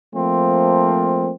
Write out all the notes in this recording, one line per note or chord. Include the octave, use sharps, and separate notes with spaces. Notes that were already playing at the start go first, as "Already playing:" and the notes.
F3 A3 A#3 C4